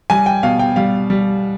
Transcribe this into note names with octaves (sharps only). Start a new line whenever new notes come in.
G3 G#5
G5
B2 F5
G5
G3 F5
G3